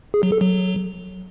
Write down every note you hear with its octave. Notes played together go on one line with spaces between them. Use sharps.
G#4
F#3
A4
F#3